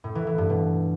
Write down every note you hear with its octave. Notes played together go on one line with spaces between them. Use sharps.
A2
E3
E3
G2
B2